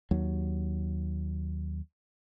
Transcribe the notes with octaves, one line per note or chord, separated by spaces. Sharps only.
D#2 F#3